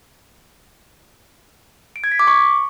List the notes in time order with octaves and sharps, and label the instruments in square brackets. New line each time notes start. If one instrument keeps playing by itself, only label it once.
[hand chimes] D7
G#6
B6
D6
C#6